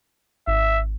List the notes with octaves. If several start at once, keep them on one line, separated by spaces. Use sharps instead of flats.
G#1 E5